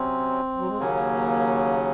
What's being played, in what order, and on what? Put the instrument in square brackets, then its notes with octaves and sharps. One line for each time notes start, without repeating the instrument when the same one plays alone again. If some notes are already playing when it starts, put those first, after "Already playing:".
Already playing: [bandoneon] C3 F#3 C#4 [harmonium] C4
[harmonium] F#3
G#3
[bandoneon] D#2 C#3 F#3 C#4 [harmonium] A#3